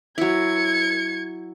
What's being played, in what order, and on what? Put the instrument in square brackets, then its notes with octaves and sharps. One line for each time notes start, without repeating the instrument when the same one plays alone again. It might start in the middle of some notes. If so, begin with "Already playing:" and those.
[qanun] F#3 E4 [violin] G#6 C#7